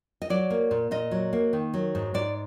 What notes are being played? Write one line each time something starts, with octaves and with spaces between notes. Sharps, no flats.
D#5
F#3 D5
A#3
A#2
A#2 D#5
F#3
A#3
D#3
F#3
G#2
G#2 D5